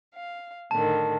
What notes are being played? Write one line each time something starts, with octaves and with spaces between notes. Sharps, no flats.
F5
A2 D3 D#3 A5